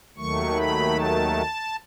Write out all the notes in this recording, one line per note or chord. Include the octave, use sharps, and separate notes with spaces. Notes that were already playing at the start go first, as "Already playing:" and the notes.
D#2 D#3 F#3 A3 C#6
B5
A5